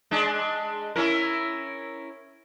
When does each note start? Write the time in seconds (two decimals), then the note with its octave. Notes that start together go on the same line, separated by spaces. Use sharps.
0.11 G#3 D4
0.96 C#4 E4 A#4